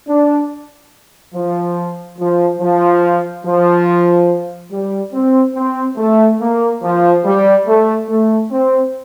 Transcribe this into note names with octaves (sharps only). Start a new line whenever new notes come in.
D4
F3
F3
F3
F3
G3
C4
C4
A3
A#3
F3
G3
A3
A3
C4